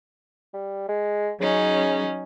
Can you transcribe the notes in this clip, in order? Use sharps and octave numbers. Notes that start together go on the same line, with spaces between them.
G3
G#3
C#3 F#3 C#4 D#4